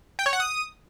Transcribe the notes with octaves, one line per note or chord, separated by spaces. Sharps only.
G5
C#5
F#5
D#6